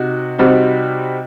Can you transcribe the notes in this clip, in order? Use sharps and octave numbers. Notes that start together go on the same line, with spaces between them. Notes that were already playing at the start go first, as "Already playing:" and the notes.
Already playing: C3 D#4 F#4
C3 G3 C4 D#4 F#4